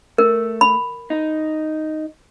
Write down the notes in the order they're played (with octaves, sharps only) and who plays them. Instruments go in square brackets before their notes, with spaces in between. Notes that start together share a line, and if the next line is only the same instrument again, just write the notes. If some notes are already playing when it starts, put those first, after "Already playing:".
[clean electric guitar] A3 [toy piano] A#4
[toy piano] B5
[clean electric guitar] D#4